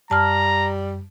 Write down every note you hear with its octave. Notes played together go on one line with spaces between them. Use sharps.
F#2 G3 A5 A#5 F6